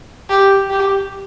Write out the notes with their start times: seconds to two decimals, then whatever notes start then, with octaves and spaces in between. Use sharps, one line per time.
0.30 G4
0.70 G4